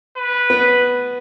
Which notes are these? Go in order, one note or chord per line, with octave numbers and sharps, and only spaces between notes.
B4
B3